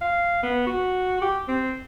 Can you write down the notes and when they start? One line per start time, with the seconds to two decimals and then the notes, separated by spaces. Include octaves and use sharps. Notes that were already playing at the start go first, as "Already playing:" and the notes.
0.01 F5
0.43 B3
0.66 F#4
1.22 G4
1.48 C4